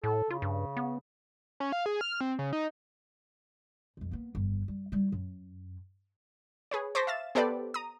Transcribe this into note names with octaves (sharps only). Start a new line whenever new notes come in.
A2 A4
C#3 F4
G2
B3
C#4
F5
G#4
F6
C4
C#3
D#4
B1 F2
A#3 B3
G1 F2
G3
G3 E4
F#2
G#4 B4 C#5
C5 A5 C#6 D6 A#6 B6
E5 F5 A6 E7
B3 G4 A4 B4 C5 D5
A#5 D#6